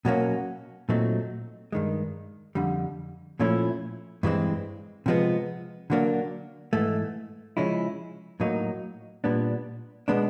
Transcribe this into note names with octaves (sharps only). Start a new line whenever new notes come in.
B2 F#3 A#3 C#4
A#2 F#3 A3 C4 D#4
G2 D#3 G#3
F2 D3 G3
A#2 F3 A3 C#4 E4
G2 E3 G#3 C4
C3 F3 G#3 B3
D3 F#3 A#3 D4
G#2 E3 A3
C#3 F3 G#3 C#4 E4
A2 F#3 A#3 D#4
A#2 G3 B3 D4
B2 G#3 B3 D4